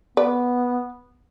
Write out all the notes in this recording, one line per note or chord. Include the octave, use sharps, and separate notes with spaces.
B3 B4 D5